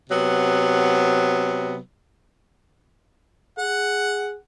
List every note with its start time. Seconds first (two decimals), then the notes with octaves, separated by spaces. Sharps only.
0.10 C3 F#3 B3
3.58 G#4 F#5